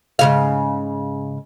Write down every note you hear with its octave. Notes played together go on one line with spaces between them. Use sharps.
G#2 C#3 F5